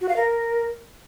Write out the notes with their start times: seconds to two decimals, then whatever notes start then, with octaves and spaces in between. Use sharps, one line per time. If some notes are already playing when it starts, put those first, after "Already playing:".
0.01 F#4
0.09 F5
0.16 A#4